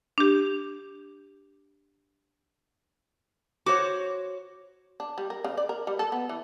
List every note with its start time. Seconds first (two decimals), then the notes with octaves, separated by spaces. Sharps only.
0.18 D4 G4
3.66 F#4 C5 C#5 D6
5.00 D4
5.18 G3
5.30 A#4
5.44 C#3
5.57 D5
5.69 A#4
5.87 G3
5.99 A4
6.12 B3
6.29 E3